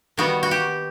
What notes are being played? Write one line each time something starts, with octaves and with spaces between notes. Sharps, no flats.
D#3 G3 B3 F#4
F#4
G4